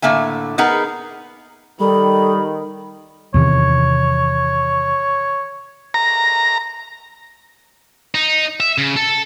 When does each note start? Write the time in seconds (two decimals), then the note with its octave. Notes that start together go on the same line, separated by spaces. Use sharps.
0.02 A2 D3 A#3 E5 G#5
0.58 B3 D#4 G#4 A#4 B4 F#5
1.80 D#3 G3 A4 B5
3.34 E2 C3 D#3 C#5
5.94 A#5
8.15 D#4
8.60 E5
8.78 C#3
8.96 A4